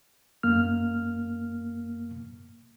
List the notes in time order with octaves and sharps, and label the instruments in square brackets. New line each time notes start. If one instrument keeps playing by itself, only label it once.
[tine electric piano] F#2 A#3 F6